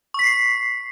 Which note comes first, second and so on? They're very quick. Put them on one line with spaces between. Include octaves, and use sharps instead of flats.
C#6 B6 C7